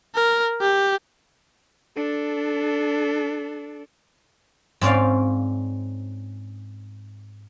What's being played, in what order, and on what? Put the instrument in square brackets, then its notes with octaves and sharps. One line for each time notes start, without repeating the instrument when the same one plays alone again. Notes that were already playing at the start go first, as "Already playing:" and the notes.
[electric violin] A#4
G4
D4 A4
[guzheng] G#2 C4 C#4 D5 F5